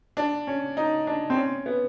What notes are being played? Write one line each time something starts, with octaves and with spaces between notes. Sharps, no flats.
D4
C#4
D#4
D4
C4
C#4
B3